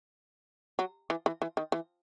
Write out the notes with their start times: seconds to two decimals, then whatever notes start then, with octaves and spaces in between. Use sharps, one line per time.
0.79 F#3
1.10 E3
1.26 E3
1.42 E3
1.57 D#3
1.72 E3